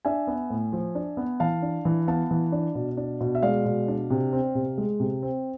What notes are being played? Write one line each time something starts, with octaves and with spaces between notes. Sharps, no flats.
D4 E5 G#5
B3
A2
F3
D4
B3
E3 F5 A5
D4
E3
B3 F5 A5
E3
D4
B2
D4
B2
E5
G#3 D5 F5
B2
D4
C3
C4
C3
G#3
C3
C4